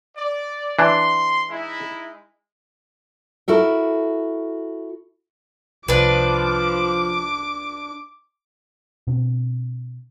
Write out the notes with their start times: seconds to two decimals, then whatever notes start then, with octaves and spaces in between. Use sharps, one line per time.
0.17 D5
0.79 E3 D4 C6
1.49 G#3 D#4 E4
3.48 E4 F#4 A4 A#4
5.88 C2 F3 D4 B4 D6
9.07 B2 C4 D4